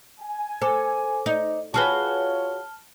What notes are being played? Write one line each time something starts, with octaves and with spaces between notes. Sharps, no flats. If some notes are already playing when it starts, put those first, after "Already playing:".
G#5
A4 C5 D6
D#4
F4 F#4 G#4 B4 C#5 A5 F6 G7